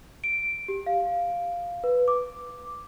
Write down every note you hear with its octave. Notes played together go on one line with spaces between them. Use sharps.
D7
G4
F5
B4
D6